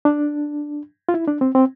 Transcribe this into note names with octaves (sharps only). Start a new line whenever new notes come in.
D4
F4
E4
D4
C4
C4